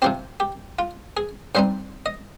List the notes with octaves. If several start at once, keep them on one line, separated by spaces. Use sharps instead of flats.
C3 F3 C4 G4
G4
F4
G#4
G2 G3 C4 D#4 C5
D#5